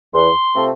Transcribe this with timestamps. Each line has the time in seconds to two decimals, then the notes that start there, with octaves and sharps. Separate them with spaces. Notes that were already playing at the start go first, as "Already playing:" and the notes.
0.14 E2 C6
0.56 C3 F3 A3 C4